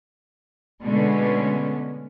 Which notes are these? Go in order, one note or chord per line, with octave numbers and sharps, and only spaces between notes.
B2 D3 G#3 A3 B3 C#4